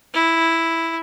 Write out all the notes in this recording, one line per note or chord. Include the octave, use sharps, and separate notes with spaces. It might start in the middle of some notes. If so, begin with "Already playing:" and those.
E4